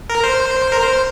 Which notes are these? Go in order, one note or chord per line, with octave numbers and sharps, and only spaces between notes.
A#4
C5
A#4
C5